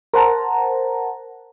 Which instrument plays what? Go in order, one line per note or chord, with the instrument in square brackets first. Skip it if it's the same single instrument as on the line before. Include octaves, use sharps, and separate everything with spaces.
[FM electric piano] A#4 C5 F#5 A5 A#5